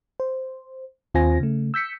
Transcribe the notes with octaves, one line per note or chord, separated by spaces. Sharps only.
C5
D#2 C4 F4 C5 G#5 A#6
C#3 A3
E6 G6 B6 C#7